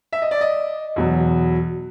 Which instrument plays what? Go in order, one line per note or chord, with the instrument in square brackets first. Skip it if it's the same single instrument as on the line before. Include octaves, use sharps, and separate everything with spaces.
[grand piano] E5
D#5
D5
D#5
E2 B2 F#3